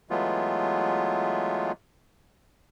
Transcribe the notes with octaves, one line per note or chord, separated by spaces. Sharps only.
E3 F#3 G#3 A3 B3 F4